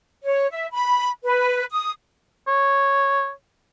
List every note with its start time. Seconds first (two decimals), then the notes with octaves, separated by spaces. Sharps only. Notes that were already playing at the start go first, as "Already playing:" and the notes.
0.24 C#5
0.50 E5
0.72 B5
1.24 B4
1.71 D#6
2.48 C#5